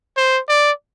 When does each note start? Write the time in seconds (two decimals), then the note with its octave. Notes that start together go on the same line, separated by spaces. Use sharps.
0.17 C5
0.49 D5